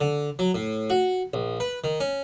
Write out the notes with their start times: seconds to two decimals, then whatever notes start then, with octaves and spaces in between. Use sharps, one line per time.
0.01 D3
0.39 F#3
0.55 A2
0.90 F#4
1.34 A#1
1.60 B4
1.84 D#3
2.00 C#4